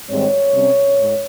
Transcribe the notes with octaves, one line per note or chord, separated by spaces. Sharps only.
G#2 D#3 G3 C4 C#5
C3 G3 C#4
G#2